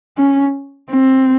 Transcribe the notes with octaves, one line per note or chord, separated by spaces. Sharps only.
C#4
C4